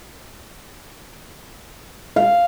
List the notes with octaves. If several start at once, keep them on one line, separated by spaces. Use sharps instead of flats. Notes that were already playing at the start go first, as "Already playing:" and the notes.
F5